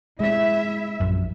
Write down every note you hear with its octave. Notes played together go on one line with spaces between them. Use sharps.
G#3 E4 E5
A#1 F#2